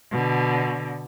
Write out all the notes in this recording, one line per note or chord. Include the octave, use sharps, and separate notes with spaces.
B2 D3